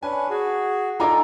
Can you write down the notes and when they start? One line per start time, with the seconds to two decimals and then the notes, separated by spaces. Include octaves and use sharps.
0.03 C#4 D4 B4 G#5
0.30 F#4 G#4
1.00 D#4 F4 A4 G#5 A#5 D6